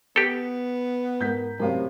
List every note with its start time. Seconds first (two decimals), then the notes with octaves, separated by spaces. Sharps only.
0.16 B3 G4 A4
1.21 G#2 A#4 G6 B6
1.60 F#2 A2 C3 A#4 F5